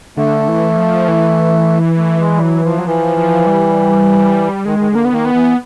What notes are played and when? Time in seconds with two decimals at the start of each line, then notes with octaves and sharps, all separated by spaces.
0.17 D3 A3
0.48 E3
0.77 F3
1.08 E3
1.97 A3
2.19 G#3
2.37 G3
2.41 F#3
2.64 F3
2.79 F#3
2.87 E3 F3
3.17 F3
3.47 G3
4.65 D#3 G#3
4.79 D#3
4.89 D3
4.95 A#3
5.05 B3
5.11 D#3 A#3
5.25 B3
5.33 E3